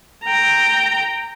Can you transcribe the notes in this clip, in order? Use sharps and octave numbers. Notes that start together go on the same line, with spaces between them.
G5 A#5